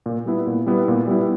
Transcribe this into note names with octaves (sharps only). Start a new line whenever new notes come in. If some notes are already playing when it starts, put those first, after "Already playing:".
A#2
G3 B3 E4
A#2
G3 B3 E4
A#2
G3 B3 E4